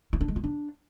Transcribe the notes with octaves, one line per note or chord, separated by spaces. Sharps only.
E4
D4
G#3
F4
D4